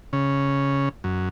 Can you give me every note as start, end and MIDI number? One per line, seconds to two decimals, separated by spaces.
0.13 0.89 49
1.04 1.29 42